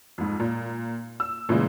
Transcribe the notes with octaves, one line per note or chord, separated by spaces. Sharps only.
F2 G#2
A#2
E6
A#2 C#3 E3 G#3